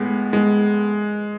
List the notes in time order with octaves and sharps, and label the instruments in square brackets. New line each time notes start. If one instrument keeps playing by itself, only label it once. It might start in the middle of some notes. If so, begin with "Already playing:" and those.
Already playing: [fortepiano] A2 B3 [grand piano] G#3
[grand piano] G#3